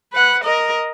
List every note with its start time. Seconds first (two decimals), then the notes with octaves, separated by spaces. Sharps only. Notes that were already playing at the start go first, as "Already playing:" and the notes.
0.13 B4 F#5
0.44 A#4 D#5